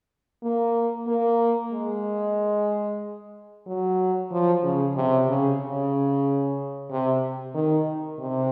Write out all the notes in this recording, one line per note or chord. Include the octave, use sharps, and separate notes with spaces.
A#3
A#3
G#3
F#3
F3
C#3
C3
C#3
C#3
C3
D#3
C3